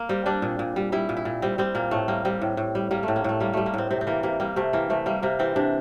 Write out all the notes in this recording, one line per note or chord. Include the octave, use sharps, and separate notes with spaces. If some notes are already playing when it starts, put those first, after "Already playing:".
Already playing: A#3
G3 C4
G3 D4
A#2
A#2
G3
G3 E4
A#2
E4
A#2
G3 C4
G3 C4
A#2 A#3
A2 A3
G3 A#3
G3 C4
A2
A2
G3
G3 A#3
A3
A2
A#3
A2 A3
G3 A#3
G3 A3
A#3
A2 C4
C3 C4
C4
E3 A#3
C3 A#3
G3 A#3
C3 A3
E3 A#3
C3 A3
G3 A#3
C3 A#3
E3 C4
C3 D4